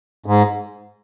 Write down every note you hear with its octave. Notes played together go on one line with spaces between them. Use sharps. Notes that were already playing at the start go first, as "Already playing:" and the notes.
G#2